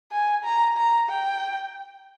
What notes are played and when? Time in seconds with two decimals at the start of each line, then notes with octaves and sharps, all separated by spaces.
0.12 G#5
0.45 A#5
0.77 A#5
1.09 G5